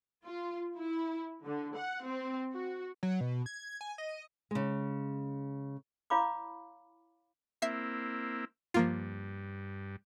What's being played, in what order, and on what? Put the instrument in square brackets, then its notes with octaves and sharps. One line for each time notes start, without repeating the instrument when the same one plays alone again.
[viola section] F4
E4
D3
F#5
C4
F#4
[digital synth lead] F#3
B2
G#6
G#5
D#5
[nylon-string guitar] C#3 G#3
[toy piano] E4 C#5 F5 B5 D6
[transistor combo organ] A#3 C4 E4 [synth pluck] E5 C7
[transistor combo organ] G2 [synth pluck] F3 A#3 F4